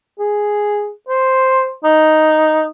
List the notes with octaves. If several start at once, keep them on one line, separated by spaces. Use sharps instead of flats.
G#4
C5
D#4